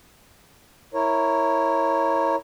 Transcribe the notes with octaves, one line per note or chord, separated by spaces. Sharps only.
E4 A#4 C#5